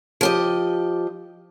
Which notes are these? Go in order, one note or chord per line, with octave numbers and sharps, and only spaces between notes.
F3 G4 D#5